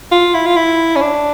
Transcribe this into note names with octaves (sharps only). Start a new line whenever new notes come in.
F4
E4
F4
E4
C#4
D4